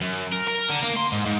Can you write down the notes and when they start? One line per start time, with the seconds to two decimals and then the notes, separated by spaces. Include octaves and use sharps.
0.01 F#2
0.32 A#4
0.48 A#4
0.70 D3
0.83 A#3
0.96 C6
1.12 G#2
1.26 G#2